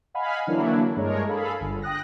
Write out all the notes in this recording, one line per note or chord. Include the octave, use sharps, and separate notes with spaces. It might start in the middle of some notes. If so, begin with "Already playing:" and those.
D#5 F5 F#5 G#5 B5
D3 E3 F#3 A#3 D4 E4
G2 G#3 D4 A#4 C#5
G#4 A4 F5 B5
G1
G5 D#6 F#6 A#6